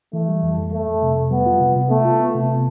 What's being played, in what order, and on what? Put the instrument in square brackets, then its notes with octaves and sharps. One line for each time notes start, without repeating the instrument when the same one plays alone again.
[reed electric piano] E3 [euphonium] A3
[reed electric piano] G3
F2
F2
[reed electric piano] F2 [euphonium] A3
[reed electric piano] F2
C3
F2
[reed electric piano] G3 [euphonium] B3
[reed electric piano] F4
C3
C3
[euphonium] A3 [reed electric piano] B3
[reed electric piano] F4
B3
C3